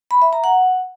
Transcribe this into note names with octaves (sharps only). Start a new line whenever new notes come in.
B5
E5
A#5
F#5